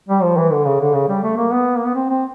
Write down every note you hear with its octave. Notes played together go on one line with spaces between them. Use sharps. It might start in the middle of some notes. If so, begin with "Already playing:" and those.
G3
F3
E3
D3
C#3
D3
C#3
G3
A3
A#3
B3
A#3
B3
C4
C4